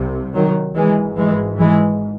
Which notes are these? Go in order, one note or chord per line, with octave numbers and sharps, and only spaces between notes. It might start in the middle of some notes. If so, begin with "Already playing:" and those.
Already playing: C2 C3
D#3 F#3
G#1 G#2 E3 G#3
E3 G#3
E3 G#3